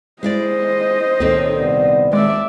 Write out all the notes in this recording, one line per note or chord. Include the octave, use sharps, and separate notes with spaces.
G#3 E4 C5 D5 D#5
C#2 A#2 D#3 C4 A4 C#5
C2 B3 D5
D#2 A2 G#3 D5 E5